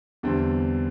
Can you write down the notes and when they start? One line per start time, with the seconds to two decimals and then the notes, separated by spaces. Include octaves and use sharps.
0.23 E2 D3 G3 C4